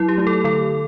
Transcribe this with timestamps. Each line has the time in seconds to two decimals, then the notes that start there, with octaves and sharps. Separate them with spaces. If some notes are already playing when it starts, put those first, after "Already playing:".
Already playing: F#3 E4
0.08 G4
0.18 A3 E4
0.27 A4
0.44 D3 A4